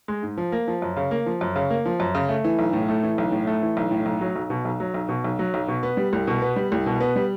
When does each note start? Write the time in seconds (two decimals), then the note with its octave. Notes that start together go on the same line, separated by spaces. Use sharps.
0.08 G#3
0.23 G#2
0.38 F3
0.52 A#3
0.68 F3
0.82 F#2
0.97 C#3
1.11 A#3
1.26 F3
1.41 F#2
1.56 C#3
1.70 A#3
1.86 F3
2.00 F#2
2.15 C#3
2.29 A3
2.44 E3
2.59 B1
2.73 A2
2.88 A3
3.03 E3
3.18 B1
3.32 A2
3.47 A3
3.62 E3
3.77 B1
3.91 A2
4.06 B1
4.21 F#3
4.36 B1
4.50 B2
4.65 B1
4.80 F#3
4.94 B1
5.09 B2
5.24 B1
5.39 F#3
5.54 B1
5.68 B2
5.83 B3
5.97 G3
6.13 C2
6.27 B2
6.42 B3
6.56 G3
6.72 C2
6.86 B2
7.00 B3
7.16 G3